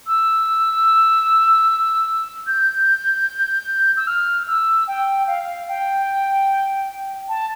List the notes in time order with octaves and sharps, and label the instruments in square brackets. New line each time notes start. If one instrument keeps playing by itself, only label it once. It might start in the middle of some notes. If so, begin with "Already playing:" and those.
[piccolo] E6
G6
E6
F6
E6
G5
F5
G5
A5